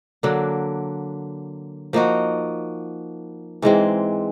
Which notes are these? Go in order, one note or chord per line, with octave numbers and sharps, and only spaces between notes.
D3 F#3 A#3 D4
F3 A#3 D#4 F#4
G#2 E3 G#3 C4